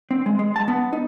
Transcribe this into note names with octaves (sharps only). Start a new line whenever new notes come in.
C4
G#3
G#3
A5
B3
D#4